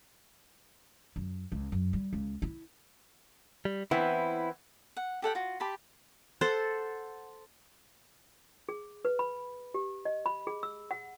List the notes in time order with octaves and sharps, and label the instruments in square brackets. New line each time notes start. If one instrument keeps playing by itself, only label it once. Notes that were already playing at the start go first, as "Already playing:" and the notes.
[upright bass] F#2
C#2
F#2
G3
C#2
E4
[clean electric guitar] G3
[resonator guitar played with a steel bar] E3 B3 C4 [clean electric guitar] E4
[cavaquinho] F#5
G4 A4 F#5 G5
F4 F#4
G4 A5 B5 C6
[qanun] A4 C5 F#5
[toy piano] G#4
B4
B5
G4
D#5
B5
G#4
E6
F#5